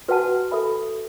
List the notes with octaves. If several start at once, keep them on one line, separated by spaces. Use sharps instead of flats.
F#4 B4 F#5 A5
A4 E5 B5